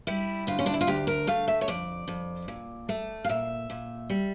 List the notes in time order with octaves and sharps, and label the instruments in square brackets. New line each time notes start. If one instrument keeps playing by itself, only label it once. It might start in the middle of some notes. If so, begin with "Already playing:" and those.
[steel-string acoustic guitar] G3 E4
D2 F4
C#4
D4
E4
F4
D2 G4
A#4
A3 F5
E5
C#5
F2 D5
F2
A#2
A3
F5
A#2 E5
A#2
G3